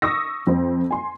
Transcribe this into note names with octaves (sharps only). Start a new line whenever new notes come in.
C#6 D#6 E6 A#6
F2 C4
G#5 C6